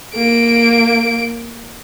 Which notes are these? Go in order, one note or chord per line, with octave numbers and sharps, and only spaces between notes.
A#3 D7